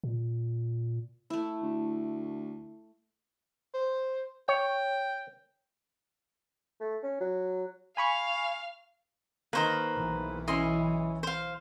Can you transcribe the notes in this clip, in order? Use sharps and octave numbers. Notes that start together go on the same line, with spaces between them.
A#2
A3 E4
D2
C5
C#5 G5
A3
C#4
F#3
F5 G#5 B5 C#6
D#3 A#3 B4 C5 A#5
B1 E3
C#4 E4 D#5 C6
C5 F5